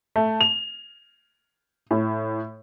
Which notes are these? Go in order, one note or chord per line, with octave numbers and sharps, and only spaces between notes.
A3
F7
A2